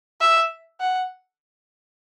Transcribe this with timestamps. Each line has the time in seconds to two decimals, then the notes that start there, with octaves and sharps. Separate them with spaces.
0.21 E5
0.80 F#5